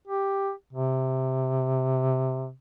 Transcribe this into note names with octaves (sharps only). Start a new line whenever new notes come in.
G4
C3